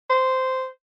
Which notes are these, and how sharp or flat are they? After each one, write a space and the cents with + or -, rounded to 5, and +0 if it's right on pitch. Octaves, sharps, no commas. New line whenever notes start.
C5 -10